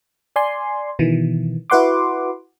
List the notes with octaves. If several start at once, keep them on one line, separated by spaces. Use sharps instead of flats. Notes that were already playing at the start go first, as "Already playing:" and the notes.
D5 G#5 C6
B2 D#3 E3
E4 F#4 B4 F#5 C6 D6